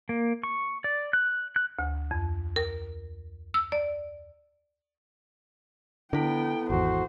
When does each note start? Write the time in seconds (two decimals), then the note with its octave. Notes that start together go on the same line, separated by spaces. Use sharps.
0.09 A#3
0.43 C#6
0.84 D5
1.13 F#6
1.56 F#6
1.79 D2
2.11 F2
2.56 A#4
3.54 E6
3.72 D5
6.13 D3 B3 E4 A4 G5
6.70 G#1 E2 F#4 C5